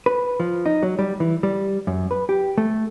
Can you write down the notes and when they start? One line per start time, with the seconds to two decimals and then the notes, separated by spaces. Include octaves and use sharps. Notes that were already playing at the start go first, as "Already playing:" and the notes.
0.06 B4
0.40 F3
0.66 D#4
0.83 F#3
0.99 G3
1.20 E3
1.43 G3
1.87 F#2
2.11 B4
2.29 G4
2.58 A3